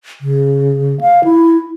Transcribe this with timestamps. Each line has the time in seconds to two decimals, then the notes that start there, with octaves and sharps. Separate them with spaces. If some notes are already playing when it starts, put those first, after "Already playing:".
0.21 C#3
1.01 F5
1.24 E4